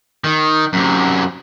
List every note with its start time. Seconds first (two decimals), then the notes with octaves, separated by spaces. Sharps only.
0.24 D#3
0.73 F#2 C3